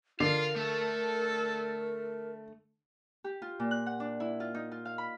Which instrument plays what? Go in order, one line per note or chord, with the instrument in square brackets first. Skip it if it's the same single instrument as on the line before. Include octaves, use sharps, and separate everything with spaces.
[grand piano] D3 D6 C7 [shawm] F4 [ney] A#4 [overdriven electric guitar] F5
[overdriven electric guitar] A3 [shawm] A4
[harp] G4
F4
A#2
F#6
F#5
D4
E4
F4
D#4
F4
F5
B5